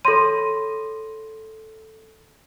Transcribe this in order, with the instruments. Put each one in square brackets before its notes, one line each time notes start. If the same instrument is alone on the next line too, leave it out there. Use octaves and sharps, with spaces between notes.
[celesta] A4 A#6 D#7 [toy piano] C#5 B5 C6